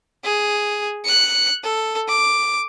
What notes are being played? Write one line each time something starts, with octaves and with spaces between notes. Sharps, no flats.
G#4
F#6 C#7
A4
D6